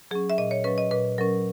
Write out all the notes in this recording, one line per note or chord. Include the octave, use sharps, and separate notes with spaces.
F#3 C#4 G#4
E5
A#2 D#5
C#5
F#3 C#4 B4
D#5
A#2 B4
F#3 C#4 A#4